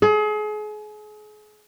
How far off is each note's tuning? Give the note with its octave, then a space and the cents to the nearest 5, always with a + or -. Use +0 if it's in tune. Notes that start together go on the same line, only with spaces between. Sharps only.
G#4 +35